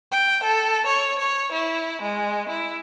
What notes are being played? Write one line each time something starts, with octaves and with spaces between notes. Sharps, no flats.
G5
A4
C#5
C#5
E4
G#3
E4